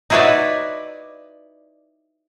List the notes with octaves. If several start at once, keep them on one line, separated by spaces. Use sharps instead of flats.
D#4 E4 F#4 B4 C#5 D5